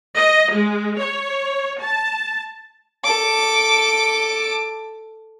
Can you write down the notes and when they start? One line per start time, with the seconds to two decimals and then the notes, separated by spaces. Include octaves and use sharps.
0.16 D#5
0.52 G#3
1.00 C#5
1.82 A5
3.04 A4 D6